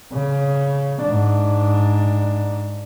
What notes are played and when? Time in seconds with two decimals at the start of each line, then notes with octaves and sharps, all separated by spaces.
0.13 C#3
1.03 G#2 D4